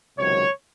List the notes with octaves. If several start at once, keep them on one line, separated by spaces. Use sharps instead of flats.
C#2 C3 D#3 F#3 C#5